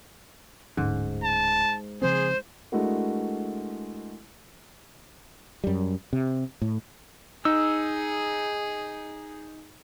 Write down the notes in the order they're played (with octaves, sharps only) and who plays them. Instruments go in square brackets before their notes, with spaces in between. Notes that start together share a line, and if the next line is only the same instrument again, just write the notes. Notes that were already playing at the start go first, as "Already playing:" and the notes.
[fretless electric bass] D1 D3 C#4 [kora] G#2
[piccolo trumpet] A5
[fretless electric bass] C#3 F3 C4 [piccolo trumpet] G#4 [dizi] C5
[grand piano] G#3 A3 D4 E4 F#4 A#4
[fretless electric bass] F#2 G3
C3
A2
[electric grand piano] D#4 [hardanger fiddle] G#4 [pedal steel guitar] E6